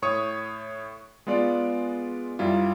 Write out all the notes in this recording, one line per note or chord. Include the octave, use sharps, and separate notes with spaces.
A2 C#5 C#6 D#6
G#3 B3 F4 D5
F#2 G3 E4 F4